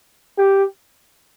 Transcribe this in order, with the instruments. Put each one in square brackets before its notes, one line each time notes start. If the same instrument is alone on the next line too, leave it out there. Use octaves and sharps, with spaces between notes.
[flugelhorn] G4